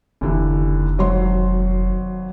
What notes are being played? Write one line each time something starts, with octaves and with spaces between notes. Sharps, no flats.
F1 D#2 D3 E3
G#1 F#3 C6